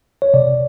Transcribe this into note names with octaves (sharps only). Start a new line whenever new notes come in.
C#5
C3 D5